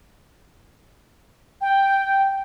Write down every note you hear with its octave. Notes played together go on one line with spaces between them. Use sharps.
G5